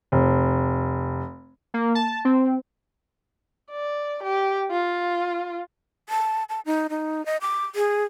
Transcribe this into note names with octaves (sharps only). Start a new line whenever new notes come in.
F1
A#3
A5
C4
D5
G4
F4
A5
A5
D#4
D#4
D#5
D6
G#4